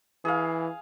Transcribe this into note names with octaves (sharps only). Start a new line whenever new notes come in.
E3 G#4 F5